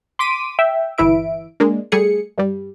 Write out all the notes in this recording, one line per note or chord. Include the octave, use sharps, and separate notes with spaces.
C6 D6 B6 D#7
E5 G5
G1 E3 E4 E5 D7
G#3 A#3 D4
G3 A3 G#4 C#7
G2 G3